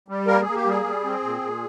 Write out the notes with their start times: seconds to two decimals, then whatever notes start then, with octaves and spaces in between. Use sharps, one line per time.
0.08 G3
0.27 A#3 A#4
0.42 G#4
0.47 A#3
0.55 G4
0.66 G3 G#4
0.85 G3
1.04 C4
1.23 A#2
1.41 A#2